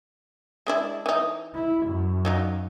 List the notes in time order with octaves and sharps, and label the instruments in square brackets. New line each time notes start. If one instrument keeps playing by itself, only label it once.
[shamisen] G#3 D4 E4
E3 D#4
[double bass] E4
F#2
[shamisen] F#3 D#4 F4